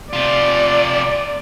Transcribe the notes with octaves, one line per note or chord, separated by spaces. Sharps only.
C3 F4 D5